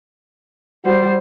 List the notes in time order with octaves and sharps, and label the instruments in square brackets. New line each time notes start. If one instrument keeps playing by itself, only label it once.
[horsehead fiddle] G3 C5 [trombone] F#4